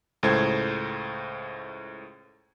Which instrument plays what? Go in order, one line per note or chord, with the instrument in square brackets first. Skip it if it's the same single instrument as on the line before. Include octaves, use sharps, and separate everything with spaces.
[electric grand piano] C#2 A2 A4 C5 G#6